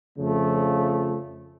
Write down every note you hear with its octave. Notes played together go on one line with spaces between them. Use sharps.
F2 C#3 F3 A3